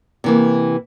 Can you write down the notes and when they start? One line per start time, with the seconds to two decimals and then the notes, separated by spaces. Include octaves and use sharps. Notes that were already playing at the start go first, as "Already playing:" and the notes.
0.24 C3 E3 A#3